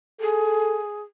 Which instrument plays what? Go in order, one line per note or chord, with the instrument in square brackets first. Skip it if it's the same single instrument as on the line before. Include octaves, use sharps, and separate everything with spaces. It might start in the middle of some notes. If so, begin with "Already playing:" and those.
[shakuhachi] G#4 [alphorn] A4